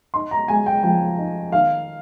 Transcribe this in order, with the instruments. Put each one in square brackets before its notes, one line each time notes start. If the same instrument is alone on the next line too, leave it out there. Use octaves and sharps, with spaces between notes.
[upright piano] D#4 C6
A#5
G#3 G#5
G5
F3 G5
D#4
D#3 F5